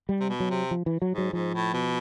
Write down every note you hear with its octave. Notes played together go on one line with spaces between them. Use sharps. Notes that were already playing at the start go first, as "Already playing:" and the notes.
G3
C3
B2
F#3
C3
F3
E3
F#3
G#2
F#3
G#2 F3
A2
B2